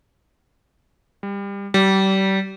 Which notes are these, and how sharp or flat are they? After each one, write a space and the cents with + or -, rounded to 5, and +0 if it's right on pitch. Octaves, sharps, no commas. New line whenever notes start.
G3 +25
G3 -30